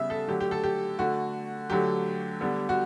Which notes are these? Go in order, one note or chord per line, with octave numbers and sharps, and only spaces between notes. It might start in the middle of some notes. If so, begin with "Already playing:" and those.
Already playing: C#3 G3 B3 E5
A4
D3 F#3 A3 G4
G4
A4
G4
D3 A3 F#4
D3 F#3 A3 G4
D3 G3 B3
F#4